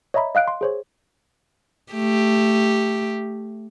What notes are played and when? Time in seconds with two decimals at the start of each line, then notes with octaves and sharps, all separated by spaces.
0.14 C#5 D#5 E5 A#5 B5
0.35 D#5 F5 F#6 D7
0.48 C6
0.61 G#4 C5 C#5
1.93 A3 G4